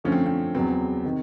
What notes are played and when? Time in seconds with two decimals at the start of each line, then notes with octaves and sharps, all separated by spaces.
0.04 F#2 D3 F3 A3 C#4
0.12 C4
0.26 C4
0.55 E2 C#3 F#3 B3 C4
1.05 C3 D#3